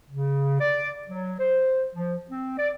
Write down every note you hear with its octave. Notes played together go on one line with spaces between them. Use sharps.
C#3
D5
F#3
C5
F3
C4
D5